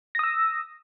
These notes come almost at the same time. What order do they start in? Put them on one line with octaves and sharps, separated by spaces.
A#6 D#6 E6